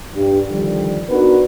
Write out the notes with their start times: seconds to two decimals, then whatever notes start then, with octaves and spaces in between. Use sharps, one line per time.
0.14 G2
0.49 D3 D#3 F3 G3
1.09 B3 D4 D#4 F#4 A#4 B4